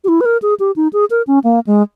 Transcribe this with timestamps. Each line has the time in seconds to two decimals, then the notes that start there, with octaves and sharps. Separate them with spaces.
0.04 G4
0.08 E4
0.21 B4
0.25 A#4
0.42 G#4
0.60 G4
0.76 D#4
0.93 G#4
1.10 A#4
1.27 C#4
1.44 A#3
1.67 G#3